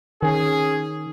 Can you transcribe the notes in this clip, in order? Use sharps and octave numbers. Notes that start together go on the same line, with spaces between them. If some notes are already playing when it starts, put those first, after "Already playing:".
D#3 C#4 G#4